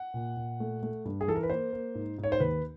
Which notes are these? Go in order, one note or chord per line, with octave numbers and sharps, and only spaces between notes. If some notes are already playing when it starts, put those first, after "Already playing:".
Already playing: F#5
A#2
A#2
A3
A3
G2
G#4
E3 A4
A#4
B4
A#3 C5
A#3
G#2
G#2
C#5
C5
D#2 B4